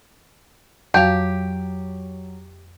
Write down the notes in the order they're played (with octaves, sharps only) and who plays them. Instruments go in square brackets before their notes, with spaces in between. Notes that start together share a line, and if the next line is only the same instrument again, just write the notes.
[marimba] F2 F5 [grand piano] F#3 [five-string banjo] G4